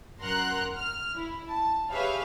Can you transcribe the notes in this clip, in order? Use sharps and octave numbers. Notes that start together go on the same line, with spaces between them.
F#2 A#4 F#5 A#5 C6 F#6
F6
E4
A5
G4 G#4 B4 C#5 E5 F5